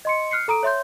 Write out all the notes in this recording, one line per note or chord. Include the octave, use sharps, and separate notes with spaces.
D#5 C6 C#7
F6 F#6 C7 C#7
A4 A#5 D#6 D7
C#5 E5 C6 G6